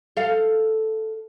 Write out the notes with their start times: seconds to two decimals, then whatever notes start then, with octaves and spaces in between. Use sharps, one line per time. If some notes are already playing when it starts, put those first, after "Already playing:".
0.17 A4 F5